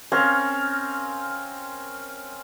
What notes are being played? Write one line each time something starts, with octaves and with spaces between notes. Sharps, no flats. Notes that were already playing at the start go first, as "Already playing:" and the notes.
C4 C#4 A#4 F5